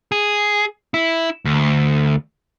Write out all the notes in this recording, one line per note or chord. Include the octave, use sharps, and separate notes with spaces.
G#4
E4
D2